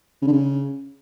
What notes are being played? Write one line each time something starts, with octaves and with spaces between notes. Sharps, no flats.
C#3
D3
C#3